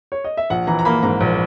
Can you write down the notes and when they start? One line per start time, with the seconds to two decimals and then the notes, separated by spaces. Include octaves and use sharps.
0.12 C#5
0.24 D#5
0.37 E5
0.50 A#1 F#5
0.67 E3 A#5
0.79 A#5
0.85 A#3 B5
1.03 G#2 A#5
1.21 A#1